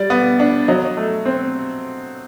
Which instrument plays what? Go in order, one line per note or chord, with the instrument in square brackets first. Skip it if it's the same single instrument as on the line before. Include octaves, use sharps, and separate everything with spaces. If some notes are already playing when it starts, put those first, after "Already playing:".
Already playing: [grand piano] G3 D5
B3
D4
F#3 D#5
A3
C4